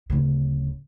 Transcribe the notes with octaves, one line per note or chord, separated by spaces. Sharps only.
D1 C#3